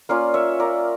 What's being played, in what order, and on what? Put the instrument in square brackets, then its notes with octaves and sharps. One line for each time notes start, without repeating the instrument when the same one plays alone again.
[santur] A#3 C#4 F4 D5 F5
C#5 E5
A#4 D5